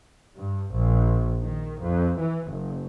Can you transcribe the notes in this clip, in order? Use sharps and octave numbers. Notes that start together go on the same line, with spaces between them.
G2
A#1
D#3
F2
E3
F#1